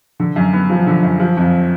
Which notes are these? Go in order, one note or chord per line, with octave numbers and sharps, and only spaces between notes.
D3
F#2
B3
F3
D3
F#2
F3
F2